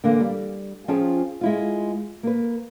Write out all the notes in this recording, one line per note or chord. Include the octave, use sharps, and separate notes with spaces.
D3 E3 A#3 A#4
G3
F3 C#4 F4 G#4 G5 A5
G#3 E4 F4
A#3 B4